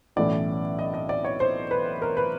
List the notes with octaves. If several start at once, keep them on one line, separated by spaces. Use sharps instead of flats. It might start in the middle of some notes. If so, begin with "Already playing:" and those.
B1 A2 E3 A3 C#4 D5
D#5
D#5
D5
C#5
C5
B4
A#4
B4